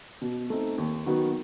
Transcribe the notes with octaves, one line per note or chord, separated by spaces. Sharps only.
B2
A3 C4 D#4
D#2
D#3 F#3 B3 F#4